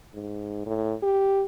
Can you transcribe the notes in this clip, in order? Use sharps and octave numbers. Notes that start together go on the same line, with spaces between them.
G#2
A2
G4